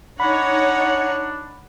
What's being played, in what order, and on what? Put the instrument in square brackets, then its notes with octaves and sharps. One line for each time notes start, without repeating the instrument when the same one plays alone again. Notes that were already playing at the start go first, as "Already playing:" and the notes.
[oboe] D4 [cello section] D#4 C#5 [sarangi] F#5 [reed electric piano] B5